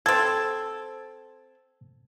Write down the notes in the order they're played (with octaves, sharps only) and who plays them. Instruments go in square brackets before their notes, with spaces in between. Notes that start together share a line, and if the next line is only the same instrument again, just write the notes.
[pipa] C4 A4 [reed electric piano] G#6